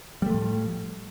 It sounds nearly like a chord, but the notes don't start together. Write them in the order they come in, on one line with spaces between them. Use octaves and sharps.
G3 A3 F3 A2